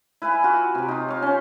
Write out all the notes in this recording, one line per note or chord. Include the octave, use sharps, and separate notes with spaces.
E4 B4 F5 G#5
F4 F#4 B4
C3 G4
D#4 F4
C#5 F5
C#4 C5